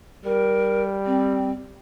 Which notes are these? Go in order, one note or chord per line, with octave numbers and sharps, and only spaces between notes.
G3 A#4
C4